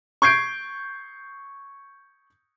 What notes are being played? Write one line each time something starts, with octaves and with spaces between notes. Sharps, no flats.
C#6 G6 G#6 C7 D7